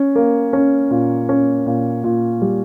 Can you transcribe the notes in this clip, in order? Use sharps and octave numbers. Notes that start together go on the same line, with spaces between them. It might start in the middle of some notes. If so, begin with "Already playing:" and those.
Already playing: C#4
A#3
C#4
A#2
C#4
A#2
A#2
G3